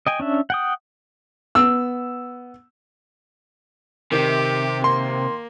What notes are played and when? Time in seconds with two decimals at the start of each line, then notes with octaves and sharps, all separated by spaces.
0.07 D#5 G5 G#5
0.20 C#4 D4 E5
0.50 F#5 G5 D#6
1.55 B3 E6
4.12 C3 D#3 G4
4.84 A#3 C6